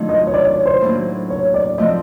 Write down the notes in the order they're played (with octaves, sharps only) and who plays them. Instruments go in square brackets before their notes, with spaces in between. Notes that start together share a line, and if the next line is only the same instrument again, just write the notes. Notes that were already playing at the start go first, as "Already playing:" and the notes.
Already playing: [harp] D#3 F#3 A3 D4 F4
[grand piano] D#5
C#5
D5
C#5
C5
[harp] A2 F#3 A#3 D4
[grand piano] C#5
D5
[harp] F3 A3 C4 [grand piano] D#5